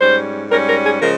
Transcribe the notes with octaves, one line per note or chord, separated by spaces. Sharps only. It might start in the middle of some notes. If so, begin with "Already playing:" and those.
G#2 G3 C#4 C5
G#2 G3 C#4 A#4
A#4
G#4
C#3 F3 G#3 A#4